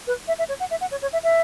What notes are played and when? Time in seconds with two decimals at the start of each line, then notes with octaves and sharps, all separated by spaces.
0.07 B4
0.27 E5
0.38 E5
0.48 C#5
0.59 F#5
0.70 E5
0.80 F#5
0.91 C#5
1.02 C#5
1.12 E5
1.23 E5